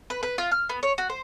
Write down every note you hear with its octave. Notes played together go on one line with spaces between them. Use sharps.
B4
B4
F4
F6
B3
C#5
F#4
C5